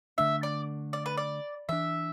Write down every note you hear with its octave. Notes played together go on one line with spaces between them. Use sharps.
D3 A3 D4 E5
D5
D5
B4
D5
E3 D4 E5